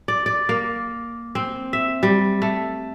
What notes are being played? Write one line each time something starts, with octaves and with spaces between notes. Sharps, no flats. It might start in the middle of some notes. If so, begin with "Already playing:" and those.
D5
D5
A#3
C4
E5
G3
A3